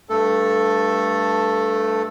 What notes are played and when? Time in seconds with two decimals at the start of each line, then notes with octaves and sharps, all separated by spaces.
0.09 G2 A3 A4